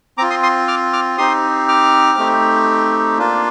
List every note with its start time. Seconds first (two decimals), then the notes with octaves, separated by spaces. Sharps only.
0.18 C4 F4 A#5 D6
0.30 C6 D#6
0.43 C6 D#6
0.68 D6 F6
0.93 D6 F6
1.18 C4 D#4 G4 C6 D#6
1.68 D6 F6
2.18 A3 C4 D#4 G4
3.18 A#3 D4 F4